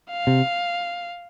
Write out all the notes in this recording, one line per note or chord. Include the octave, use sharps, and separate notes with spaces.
F5
C3